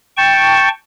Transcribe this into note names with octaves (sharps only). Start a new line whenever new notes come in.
G5 A5 C#6